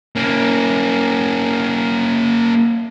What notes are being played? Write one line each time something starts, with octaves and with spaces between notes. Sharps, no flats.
A#3 C#4